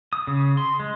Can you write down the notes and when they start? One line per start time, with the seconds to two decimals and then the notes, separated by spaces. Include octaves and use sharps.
0.13 D#6
0.27 C#3
0.57 C6
0.80 G#3